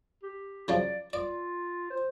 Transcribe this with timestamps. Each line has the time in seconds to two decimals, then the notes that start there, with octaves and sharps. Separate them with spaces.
0.23 G4
0.68 C#3 F3 F#3 D5
1.13 F4 D5
1.90 C5